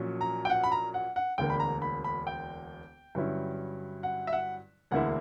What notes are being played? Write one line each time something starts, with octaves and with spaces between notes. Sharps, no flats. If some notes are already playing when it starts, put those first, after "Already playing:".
Already playing: A#1 A#2 F#3 C#4
A#5
G5
F#5
B5
A#5
F#5
F#5
E1 D2 D3 A#3 G5
B5
A#5
B5
B5
G5
G2 D3 F#3 C#4 E4
F#5
E5
F#5
E1 D2 D3 A#3 E4 F#5